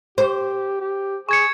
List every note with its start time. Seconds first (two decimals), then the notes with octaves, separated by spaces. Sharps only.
0.18 G4 C5
0.81 G4
1.29 G#4 C#6 G#6 C#7